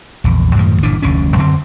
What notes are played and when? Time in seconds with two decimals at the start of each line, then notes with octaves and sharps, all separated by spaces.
0.24 A#1 E2
0.55 F#2 A2 D#3 F3
0.83 G1 A#2 E3 D4
1.02 F1 D2 D3 C#4
1.36 F#2 D3 C4